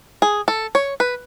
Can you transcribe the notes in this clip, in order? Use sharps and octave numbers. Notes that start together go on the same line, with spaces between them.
G#4
A4
C#5
B4